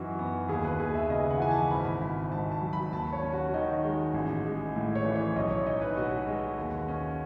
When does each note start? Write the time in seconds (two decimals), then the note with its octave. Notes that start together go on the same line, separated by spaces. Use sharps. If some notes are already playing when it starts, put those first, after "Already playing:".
Already playing: F#2 E3 D#4 F#4
0.19 B3
0.48 D#2 G#4
0.65 B4
0.80 D#2 G#4
0.95 E5
1.09 C#3 D#5
1.30 F#5
1.40 E3 G#5
1.51 A5
1.70 G#1 B5
2.01 G#1
2.32 G#2 A5
2.52 A5
2.62 F#3
2.73 B5
2.92 D#2 A5
3.13 C#5
3.23 C#4
3.33 F#4
3.54 D#3 D#4
3.84 G#3
4.14 A1
4.45 G#3
4.76 A2
4.95 C#5
5.05 E3
5.16 C#5
5.36 B1 D#5
5.51 C#5
5.66 D#4 D#5
5.81 B4
5.97 B2 F#4
6.27 G#3
6.57 D#2
6.88 C#4